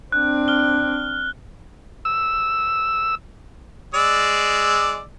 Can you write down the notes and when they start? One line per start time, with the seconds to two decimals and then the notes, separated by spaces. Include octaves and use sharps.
0.12 C4 D4 F#6
0.48 F6 G7
2.05 E6
3.94 G#3 D5 E6